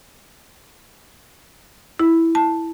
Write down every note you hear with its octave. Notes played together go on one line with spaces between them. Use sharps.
E4
A5